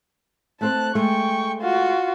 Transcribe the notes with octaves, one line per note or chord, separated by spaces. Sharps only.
A3 C4 C5 A5 F#6
G#3 A3 G5 C#6
F4 F#4